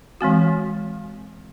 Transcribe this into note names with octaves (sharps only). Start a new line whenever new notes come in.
E3 G#3 C4 F#4